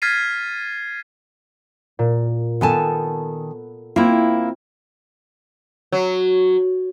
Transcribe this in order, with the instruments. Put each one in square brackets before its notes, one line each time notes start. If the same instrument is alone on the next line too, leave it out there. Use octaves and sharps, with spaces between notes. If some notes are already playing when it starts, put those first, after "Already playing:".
[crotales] F6 G#6 A6 B6 C7 D#7
[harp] A#2
[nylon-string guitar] D#3 G#5 A5 [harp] B3 A4
[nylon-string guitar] A#3 E4 [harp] C4 F4
[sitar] F#3